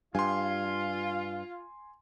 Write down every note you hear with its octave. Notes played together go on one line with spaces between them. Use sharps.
G2 F4 G#5 C6